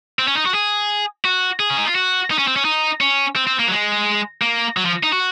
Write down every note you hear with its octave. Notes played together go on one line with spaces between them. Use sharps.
C4
C#4
D#4
F#4
G#4
F#4
G#4
C#4
D#4
F4
F#4
D#4
C#4
C4
C#4
D#4
C#4
C4
C4
A#3
F#3
G#3
A#3
F#3
F3
D#4
F#4